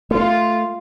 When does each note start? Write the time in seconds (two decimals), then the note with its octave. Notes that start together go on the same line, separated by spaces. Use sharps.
0.11 A3 F4